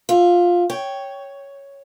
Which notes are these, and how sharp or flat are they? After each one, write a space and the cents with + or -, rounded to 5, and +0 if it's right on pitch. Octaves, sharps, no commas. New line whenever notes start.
F4 +10 E5 +25
C#5 +0 G5 +0